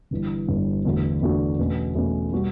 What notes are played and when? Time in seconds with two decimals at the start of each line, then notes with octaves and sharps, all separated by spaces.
0.11 G1 G2 E3
0.48 G1 G2 E3
0.85 E2 D3 A3 D4 F#4
1.21 E2 D3 A3 D4 F#4
1.59 E2 B2 A3 C#4
1.95 E2 B2 A3 C#4
2.32 B2 G3 B3 F#4